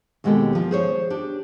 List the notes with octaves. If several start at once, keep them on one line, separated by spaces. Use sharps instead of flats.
D#2 B2 G#3 C4 G4 A4
F3
G#4 C5 C#5
D4 G4